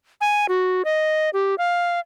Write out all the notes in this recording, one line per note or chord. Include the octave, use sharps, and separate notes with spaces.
G#5
F#4
D#5
G4
F5